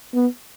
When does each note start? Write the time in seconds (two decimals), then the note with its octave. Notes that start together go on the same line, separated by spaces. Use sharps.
0.14 B3